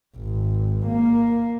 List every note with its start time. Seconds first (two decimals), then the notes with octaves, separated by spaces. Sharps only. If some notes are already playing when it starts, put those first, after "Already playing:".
0.17 G#1
0.87 A#3